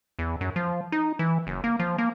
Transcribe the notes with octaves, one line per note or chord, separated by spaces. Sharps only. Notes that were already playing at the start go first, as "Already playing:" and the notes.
E2
F#2
F3
D#4
E3
F#1
A#3
F3
A#3